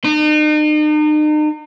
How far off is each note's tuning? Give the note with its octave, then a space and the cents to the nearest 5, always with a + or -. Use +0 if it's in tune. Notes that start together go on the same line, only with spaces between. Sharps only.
D#4 -40